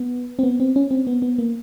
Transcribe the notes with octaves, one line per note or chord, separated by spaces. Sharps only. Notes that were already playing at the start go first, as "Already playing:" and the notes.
Already playing: B3
C4
B3
C4
C#4
C4
B3
B3
A#3